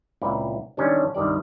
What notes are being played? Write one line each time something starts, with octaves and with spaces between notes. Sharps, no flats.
C#2 A#2 C4 E4 D5
C3 D#3 E3 G3 C#4 D4
C2 G2 D#3 G3 D5